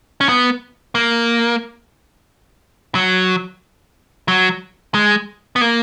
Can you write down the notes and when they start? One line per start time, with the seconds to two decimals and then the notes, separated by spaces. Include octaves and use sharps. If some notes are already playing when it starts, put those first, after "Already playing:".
0.21 C#4
0.29 B3
0.95 A#3
2.95 F#3
4.28 F#3
4.94 G#3
5.56 B3
5.61 A#3